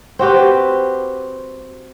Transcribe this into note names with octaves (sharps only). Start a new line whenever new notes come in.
C4 F#4 G4 B4